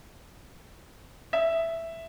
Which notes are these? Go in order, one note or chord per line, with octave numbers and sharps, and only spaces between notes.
E5